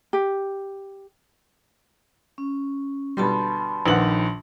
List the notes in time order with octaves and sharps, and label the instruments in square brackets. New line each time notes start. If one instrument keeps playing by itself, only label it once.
[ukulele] G4
[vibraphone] C#4
[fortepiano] B2 D3 G3 [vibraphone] A5 B5 C6
[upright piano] A#1 D#3 F#7 [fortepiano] B4 F#5